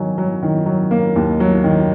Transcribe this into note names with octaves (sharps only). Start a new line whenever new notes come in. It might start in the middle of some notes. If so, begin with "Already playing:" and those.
Already playing: D#3 F#3 G#5
F#3
D#3
F#3
A#3
D#2
F#3
D#3